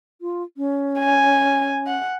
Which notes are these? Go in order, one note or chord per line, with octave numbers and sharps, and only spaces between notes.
F4
C#4
G#5
F#5